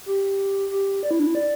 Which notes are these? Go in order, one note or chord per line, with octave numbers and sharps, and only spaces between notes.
G4
G4
D5
E4
D4
E4
D5